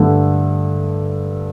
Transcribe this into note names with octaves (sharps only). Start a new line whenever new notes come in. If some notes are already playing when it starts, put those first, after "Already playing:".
Already playing: G2 D3 A3